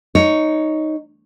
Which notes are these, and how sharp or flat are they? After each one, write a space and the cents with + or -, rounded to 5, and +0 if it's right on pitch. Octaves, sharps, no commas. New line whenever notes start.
D#4 +0 C#5 +10